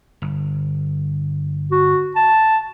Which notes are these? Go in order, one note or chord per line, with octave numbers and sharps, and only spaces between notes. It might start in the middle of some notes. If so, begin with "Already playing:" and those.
G1
F#4
A5